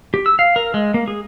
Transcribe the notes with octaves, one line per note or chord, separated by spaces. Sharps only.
G4
E6
F5
A#4
G#3
A#3
G#4